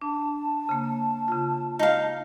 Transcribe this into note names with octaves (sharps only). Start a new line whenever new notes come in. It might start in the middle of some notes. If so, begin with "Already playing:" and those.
D4 A5
C#3 A#3
C#3 F4
D#4 F5